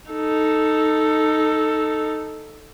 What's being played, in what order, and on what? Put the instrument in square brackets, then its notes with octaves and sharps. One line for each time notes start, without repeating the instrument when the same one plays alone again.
[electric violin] D#4 A4